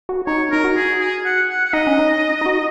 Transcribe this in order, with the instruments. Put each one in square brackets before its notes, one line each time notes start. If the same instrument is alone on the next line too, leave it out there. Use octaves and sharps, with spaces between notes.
[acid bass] F#4
[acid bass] D#4 [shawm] C#5
[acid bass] D#4 [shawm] A#4
[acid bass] F#4
[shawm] G#4
G#4
F#5
F#5
F#5
[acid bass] D#4 [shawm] D#5
[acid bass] C#4
D#4
D#4
F#4